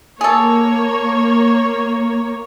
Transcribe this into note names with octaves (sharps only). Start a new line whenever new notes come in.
A#3 G#4 A4 C#5